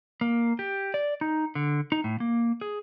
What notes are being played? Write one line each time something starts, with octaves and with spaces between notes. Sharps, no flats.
A#3
G4
D5
D#4
D3
D#4
A2
A#3
G#4